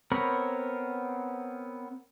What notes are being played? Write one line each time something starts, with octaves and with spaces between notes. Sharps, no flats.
B3 C4 A#4 C#5 B5